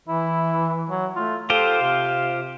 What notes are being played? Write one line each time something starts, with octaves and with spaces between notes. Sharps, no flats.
E3 E4
F#3
A3 F4
F4 G4 A4 C5 F5
C3